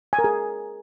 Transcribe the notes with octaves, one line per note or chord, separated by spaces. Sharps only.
G#5
A#4
G#4